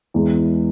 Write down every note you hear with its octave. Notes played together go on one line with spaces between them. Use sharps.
E2 E3 G#3